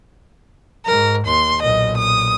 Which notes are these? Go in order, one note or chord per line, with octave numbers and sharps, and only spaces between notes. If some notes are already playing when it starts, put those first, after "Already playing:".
G#2 A#4
D#2 C6
B1 A#2 D#5
D#6